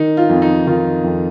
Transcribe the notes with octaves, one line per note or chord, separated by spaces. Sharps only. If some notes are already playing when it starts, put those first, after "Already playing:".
Already playing: D#3 D#4
F4
F2
D#4
D#3 F4
F2